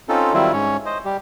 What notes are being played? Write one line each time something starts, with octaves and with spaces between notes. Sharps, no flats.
C4 C#4 D#4 F4 A4
D#3 F#3 G3 C4 E4 F4
G#2 C#4 C#5
C5 D#5
G3 G4